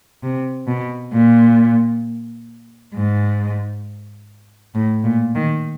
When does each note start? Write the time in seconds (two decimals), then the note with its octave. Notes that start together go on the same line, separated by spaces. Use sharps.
0.23 C3
0.67 B2
1.13 A#2
2.94 G#2
4.74 A2
5.04 A#2
5.35 D#3